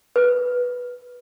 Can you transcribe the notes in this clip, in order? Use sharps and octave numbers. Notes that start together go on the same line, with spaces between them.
B4